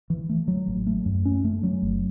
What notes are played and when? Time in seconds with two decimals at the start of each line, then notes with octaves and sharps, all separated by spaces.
0.10 E3
0.29 A3
0.48 F#3
0.68 A1
0.87 A3
1.06 F#2
1.25 C#4
1.44 A3
1.63 F#3
1.83 F#1